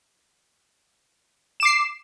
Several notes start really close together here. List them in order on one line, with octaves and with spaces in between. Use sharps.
E7 D6 C7